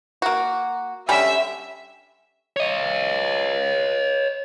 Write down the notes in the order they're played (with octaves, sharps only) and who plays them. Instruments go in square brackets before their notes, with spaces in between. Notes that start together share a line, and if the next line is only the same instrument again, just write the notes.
[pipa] A#3 F#4
[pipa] D3 G3 C#4 [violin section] E5
[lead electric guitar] C#5 D#5